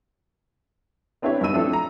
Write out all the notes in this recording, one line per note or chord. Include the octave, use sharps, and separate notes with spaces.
B3 C4 D4 E4 G4 C#5
G2 B3 D#4 E6 D#7
F3 A3 C4 D4 E4 A4
A#5